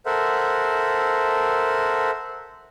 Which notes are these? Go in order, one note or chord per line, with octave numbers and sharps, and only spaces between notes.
A4 A#4 C5 E5 F#5